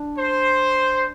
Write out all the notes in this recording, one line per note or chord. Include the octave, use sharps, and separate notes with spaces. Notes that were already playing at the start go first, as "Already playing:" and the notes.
Already playing: D4
C5